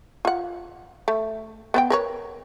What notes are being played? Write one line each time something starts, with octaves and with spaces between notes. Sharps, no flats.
F4 F#5
A3
B3 C5 G5
A#4 B4 C#5